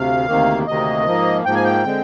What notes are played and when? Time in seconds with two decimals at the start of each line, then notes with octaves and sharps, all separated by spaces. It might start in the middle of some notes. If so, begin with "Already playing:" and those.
Already playing: D2 C3 F5
0.28 D2 C3 D#3 A#3
0.67 D2 C3 D#3 A#3 D#5
1.06 G#2 F3 A#3
1.45 G#2 F3 A#3 G5
1.55 G#5
1.64 G5
1.85 D3 G#3 C4